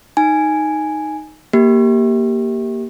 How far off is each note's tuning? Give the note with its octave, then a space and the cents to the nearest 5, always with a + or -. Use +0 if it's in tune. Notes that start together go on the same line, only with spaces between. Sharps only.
D#4 +0 G#5 +0
A#3 +0 G4 +0